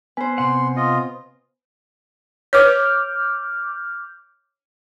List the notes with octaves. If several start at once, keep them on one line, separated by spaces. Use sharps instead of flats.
B3 B4 C5 G#5
C3 F#5 C6
F4 D#5
B4 C#5 D6 F6 G6